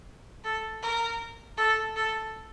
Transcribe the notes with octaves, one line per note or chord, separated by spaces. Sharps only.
A4
A#4
A4
A4